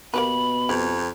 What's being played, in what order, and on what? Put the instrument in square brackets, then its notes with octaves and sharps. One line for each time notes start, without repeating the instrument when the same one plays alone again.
[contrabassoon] B2 [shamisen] A#3 G4 B4 [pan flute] B5
[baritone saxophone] F2 [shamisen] G4